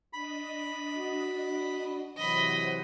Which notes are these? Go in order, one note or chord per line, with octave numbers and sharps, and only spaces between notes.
D4 D#5 B5
F#4
C3 E3 F#3 C5 D#5 F#5 B5